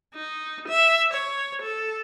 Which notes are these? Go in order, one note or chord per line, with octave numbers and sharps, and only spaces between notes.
D#4
E5
C#5
A4